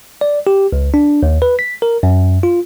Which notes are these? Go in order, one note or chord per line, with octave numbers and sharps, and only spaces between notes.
D5
G4
C#2
D4
D#2
B4
B6
A#4
F#2
F4